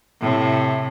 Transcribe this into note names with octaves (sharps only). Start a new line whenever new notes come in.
A2 C3